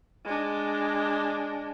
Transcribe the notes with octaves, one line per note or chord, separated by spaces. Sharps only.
G#3 D4